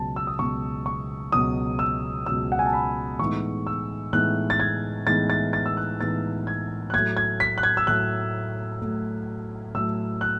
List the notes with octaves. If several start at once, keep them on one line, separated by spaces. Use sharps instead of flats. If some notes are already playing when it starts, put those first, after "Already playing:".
Already playing: C#2 B2 F#3 A5
E6
D#6
C#2 B2 F#3 C#6
C#6
C#2 B2 F#3 D#6
E6
C#2 B2 F#3 E6
F#5
G#5
A5
B5
A2 E3 G#3 B3 D#4 C#6
E6
A2 E3 G#3 B3 D#4 F#6
A6
G#6
A2 E3 G#3 B3 D#4 A6
A6
A6
E6
F#6
A2 E3 G#3 B3 D#4 A6
G#6
F#6
A2 F#3 A3 G#6
G#6
B6
F#6
G#6
E6
A2 F#3 A3 F#6
A2 F#3 A3
A2 F#3 A3 E6
F#6